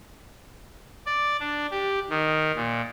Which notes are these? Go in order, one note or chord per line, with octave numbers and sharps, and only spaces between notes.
D5
D4
G4
D#3
A#2